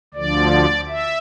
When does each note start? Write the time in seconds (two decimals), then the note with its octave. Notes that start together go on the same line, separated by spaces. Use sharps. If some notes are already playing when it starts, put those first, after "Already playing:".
0.14 D2 D3 F3 D5
0.89 E5